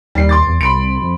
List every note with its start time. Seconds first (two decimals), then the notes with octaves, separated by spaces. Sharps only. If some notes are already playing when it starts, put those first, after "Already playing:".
0.15 D#2 G3 C7
0.29 C6 D6 A6
0.47 E2
0.61 C2 B5 C6 D7
1.02 F2